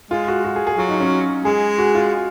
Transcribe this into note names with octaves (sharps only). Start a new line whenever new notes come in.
G#3 F4
F#4
F#4
G#4
G#4
F#3 F4
D#4
C#4
G#3 G#4
F#4
F4